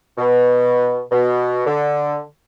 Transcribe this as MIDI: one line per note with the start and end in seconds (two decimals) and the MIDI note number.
0.18 1.02 47
1.11 1.62 47
1.66 2.19 50